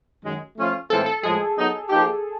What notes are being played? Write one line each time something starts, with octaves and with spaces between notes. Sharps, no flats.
F#2 D#3 G#3
F3 A3 C#4 F4
A2 E3 G#3 C4 F4 A4
A4
A2 F3 G#3 G#4
F#3 B3 D#4
F3 A#3 D#4 G4